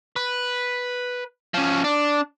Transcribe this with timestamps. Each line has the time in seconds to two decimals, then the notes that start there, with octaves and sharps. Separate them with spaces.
0.16 B4
1.54 F3 C#4
1.84 D4